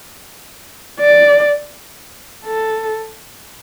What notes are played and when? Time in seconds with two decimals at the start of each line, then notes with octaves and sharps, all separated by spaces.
1.00 D5
2.46 A4